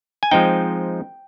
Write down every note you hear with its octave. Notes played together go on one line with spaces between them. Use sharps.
G#5
F3 G#3 C4 D#4 G5